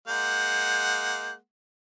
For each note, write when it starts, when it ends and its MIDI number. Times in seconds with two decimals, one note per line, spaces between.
0.08 1.36 56
0.08 1.36 58
0.08 1.36 78
0.08 1.32 91